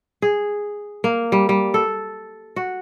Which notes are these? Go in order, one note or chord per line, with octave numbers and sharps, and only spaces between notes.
G#4
A#3
G3
G3
A4
F#4